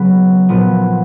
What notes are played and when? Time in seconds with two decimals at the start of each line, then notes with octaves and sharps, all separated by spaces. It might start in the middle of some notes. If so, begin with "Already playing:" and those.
Already playing: C#3 F#3 B3
0.49 A#2 F3 B3